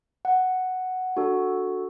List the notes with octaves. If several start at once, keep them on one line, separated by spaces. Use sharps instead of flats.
F#5
D4 F#4 A4